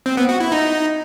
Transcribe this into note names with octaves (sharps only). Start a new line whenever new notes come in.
C4
B3
F#4
E4
D#4